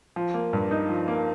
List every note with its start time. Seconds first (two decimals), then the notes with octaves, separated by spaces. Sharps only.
0.16 F3
0.34 A#3
0.53 G2
0.71 D#4
0.89 F3
1.08 A#3